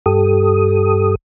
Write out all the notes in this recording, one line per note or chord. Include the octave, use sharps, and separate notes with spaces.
G2 G4 A4 D#6